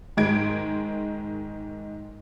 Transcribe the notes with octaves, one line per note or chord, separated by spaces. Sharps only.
G#2 D#3 G#3 G#6 D7